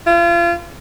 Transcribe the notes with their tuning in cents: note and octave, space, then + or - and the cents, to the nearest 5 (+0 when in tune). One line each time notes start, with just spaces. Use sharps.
F4 -35